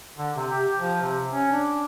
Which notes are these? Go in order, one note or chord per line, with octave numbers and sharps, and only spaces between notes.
D3
C3
G4
F3
C3
C#4
D4